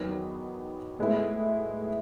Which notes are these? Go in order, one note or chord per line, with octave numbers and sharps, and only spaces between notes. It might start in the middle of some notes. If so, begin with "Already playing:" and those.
Already playing: E2 D#3 F#3 B3 D#4
A2 G#3 B3 E4